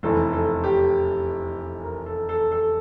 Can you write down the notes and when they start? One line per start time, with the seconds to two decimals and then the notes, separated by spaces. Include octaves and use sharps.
0.03 F1 E2 E3 A4
0.33 A4
0.64 G4
1.84 A#4
2.06 A4
2.29 A4
2.52 A4